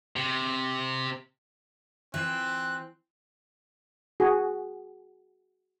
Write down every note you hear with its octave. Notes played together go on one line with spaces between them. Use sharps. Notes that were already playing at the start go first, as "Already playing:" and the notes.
C3
E3 C4 F4 E5 F#6
F#4 G#4